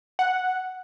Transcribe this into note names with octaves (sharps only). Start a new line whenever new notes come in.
F#5